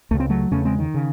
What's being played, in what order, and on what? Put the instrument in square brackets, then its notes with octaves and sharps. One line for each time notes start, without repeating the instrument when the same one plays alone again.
[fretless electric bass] C#2 C#3 A3
C4
F#3 A3
E2 C#3 A3 C#4
G#3 C4
D#3
C#3